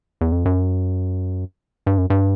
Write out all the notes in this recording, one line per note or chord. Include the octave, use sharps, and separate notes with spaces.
E2
F2
F#2
G2
F#2
G2